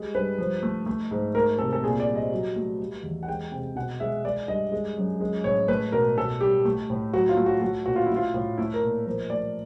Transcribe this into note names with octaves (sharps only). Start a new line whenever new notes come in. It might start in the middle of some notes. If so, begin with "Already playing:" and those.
Already playing: G3 G#3
G2 B4
F3
A3
A3
G#2
A3 A#4
C3 A4
A4
A#2 G#4
D5
G3
D#5
F#3
A3
G3
E2
F#5
G#3 G5
C3 G5
B2 F#5
G#3 E5
G#3 D5
G2 D#5
G#3
F#2
G#3
A2 C#5
A3 B4
B2 A#4
B2 A4
G3 G4
A3
A2
F#3 F#4
F4
A3
F#4
A3 F#4
A#2 F#4
F4
A3 E4
F4
A2
A3 E4
A#4
A#2
F3 A#4
A3 D5